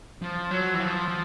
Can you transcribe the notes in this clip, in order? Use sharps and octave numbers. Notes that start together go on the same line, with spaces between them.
F3
F#3
E3
F3
F3